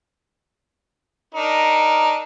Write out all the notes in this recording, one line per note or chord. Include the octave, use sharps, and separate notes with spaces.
D4 D#4 A#4